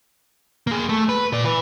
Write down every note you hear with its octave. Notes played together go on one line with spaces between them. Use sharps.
A#3 G#4
A3
B4
A#2 D5
E4 B4